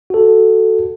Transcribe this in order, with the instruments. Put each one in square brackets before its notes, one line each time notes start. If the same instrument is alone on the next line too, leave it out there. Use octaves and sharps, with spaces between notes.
[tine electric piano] F#4 A4